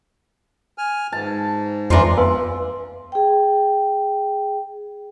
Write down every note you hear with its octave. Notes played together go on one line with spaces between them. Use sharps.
G#5 F6
G#2 A5
F2 E3 F3 D4 A#5 C6
B4 F5 G#5 C6 E6
G#4 G5